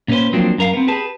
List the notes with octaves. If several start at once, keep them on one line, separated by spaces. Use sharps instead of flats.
A#2 C#4 G4 B4 C5
F3 F#3 A#3 C4 D4
F#2 A#4 F5
B3 C4
G4 G#4 B4 A5